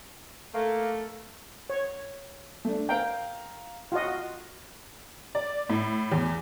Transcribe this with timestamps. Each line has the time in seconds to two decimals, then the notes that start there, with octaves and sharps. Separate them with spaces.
0.54 A3 A#3
1.70 C#5
2.65 A3 D4
2.89 A#4 F5 G5 A#5
3.92 F4 F#4 D#5
5.35 D5
5.69 A2
6.12 E2